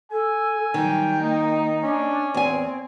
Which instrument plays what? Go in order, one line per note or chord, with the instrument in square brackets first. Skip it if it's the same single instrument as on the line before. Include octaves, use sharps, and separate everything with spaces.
[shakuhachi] A4 [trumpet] G#5
[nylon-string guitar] D#3 [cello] F#3 G3 [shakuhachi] G5
[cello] A#3 D#4
[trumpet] C#4 [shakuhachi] D4
[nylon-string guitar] E2 G#5 [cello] C4 [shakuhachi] C#5